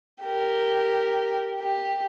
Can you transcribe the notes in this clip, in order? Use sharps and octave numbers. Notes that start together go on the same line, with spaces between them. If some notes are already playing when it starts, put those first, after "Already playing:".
G4 A#4
G4